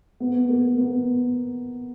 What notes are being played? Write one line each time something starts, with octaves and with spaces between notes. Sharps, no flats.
B3
A#3
B3